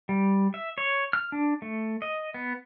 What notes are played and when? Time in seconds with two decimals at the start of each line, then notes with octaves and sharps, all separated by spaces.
0.09 G3
0.54 E5
0.78 C#5
1.13 F6
1.32 D4
1.62 A3
2.02 D#5
2.34 B3